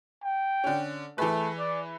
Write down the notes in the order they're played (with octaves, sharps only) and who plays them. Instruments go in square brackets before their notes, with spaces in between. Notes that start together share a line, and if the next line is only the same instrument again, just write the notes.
[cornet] G5
[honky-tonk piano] D3 C#4
[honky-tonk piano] E3 G#4 B4 [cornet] A3
[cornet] D5